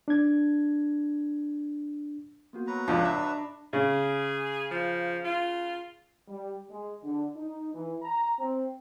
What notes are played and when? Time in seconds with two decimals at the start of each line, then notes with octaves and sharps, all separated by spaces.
0.08 D4 G#6
2.53 A#3 B3 F#4
2.67 F#3 B4 A#5
2.88 C#2 F3 D4 D5 D#5 B5
3.05 E5
3.73 C#3 G#4
4.71 F3
5.25 F4
6.27 G3
6.70 G#3
7.03 D3
7.36 D#4
7.73 E3
8.02 A#5
8.39 C4